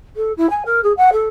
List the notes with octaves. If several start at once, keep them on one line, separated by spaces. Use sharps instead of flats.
A4
E4
G#5
A#4
G#4
F#5
A4